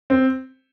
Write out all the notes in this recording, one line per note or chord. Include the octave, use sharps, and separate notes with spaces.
C4